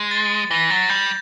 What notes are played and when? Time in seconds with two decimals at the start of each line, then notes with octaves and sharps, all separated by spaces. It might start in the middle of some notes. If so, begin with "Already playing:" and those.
Already playing: G#3
0.11 A6
0.51 E3 A#6
0.70 F#3 A6
0.89 G3 G6